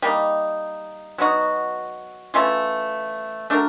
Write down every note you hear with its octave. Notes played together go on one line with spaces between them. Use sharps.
G3 A#3 D#4
F#3 B3 D#4 F#4
E3 A3 C#4 F4
A3 D4 F#4 A#4